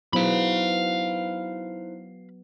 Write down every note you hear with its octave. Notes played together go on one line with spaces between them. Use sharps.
F#3 B3 D#4 E4 C5 F5 B5